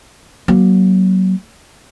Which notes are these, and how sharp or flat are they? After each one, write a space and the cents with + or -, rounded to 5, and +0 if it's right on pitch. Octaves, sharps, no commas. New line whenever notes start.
F#3 +20 A#3 +30